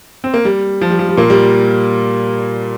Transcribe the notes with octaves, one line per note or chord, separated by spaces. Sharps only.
C4
A#3
G3
F3
G3
F3
G3
A#2 A#3
G3